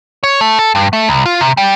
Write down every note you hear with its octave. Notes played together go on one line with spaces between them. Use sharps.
C#5
A3
A4
G2
A3
C2
F4
C3
G3